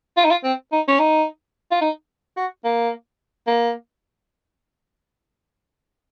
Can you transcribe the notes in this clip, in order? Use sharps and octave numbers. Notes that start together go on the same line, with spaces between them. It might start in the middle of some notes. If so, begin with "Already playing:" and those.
F4
D#4
F4
C4
D#4
C#4
D#4
F4
D#4
F#4
A#3
A#3